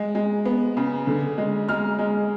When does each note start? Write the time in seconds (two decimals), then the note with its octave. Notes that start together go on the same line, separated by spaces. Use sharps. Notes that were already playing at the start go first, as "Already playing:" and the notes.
Already playing: G#3
0.15 G#3
0.46 B3
0.77 C#3
1.07 D3
1.38 G#3
1.69 G#3 F6
1.99 G#3